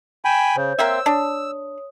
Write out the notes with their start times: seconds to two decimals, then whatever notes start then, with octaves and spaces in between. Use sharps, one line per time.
0.25 G5 G#5 B5 G6 D#7 E7
0.56 C#3 C5 C#5 G6
0.79 A#3 C4 E5 E6
1.06 D4 C#5 D#6